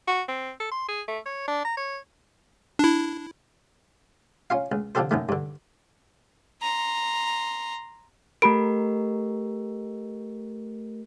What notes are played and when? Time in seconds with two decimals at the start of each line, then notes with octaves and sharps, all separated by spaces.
0.07 F#4
0.28 C4
0.60 A4
0.71 C6
0.88 G#4
1.08 A3
1.25 C#5
1.48 D4
1.65 A#5
1.77 C#5
2.79 D4 E4
4.50 C#4 F4 F5
4.72 C#2
4.95 D3 F3 C4 G4 A4 C5
5.11 B1 F#2 D#3 A3
5.29 G2 D3
6.62 A#5 C6
8.42 A3 G4 A#4 B5 D7